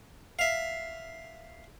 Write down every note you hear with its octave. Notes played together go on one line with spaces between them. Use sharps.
E5 F5